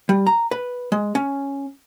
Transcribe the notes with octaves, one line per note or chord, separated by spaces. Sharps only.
G3
A#5
B4
G#3
C#4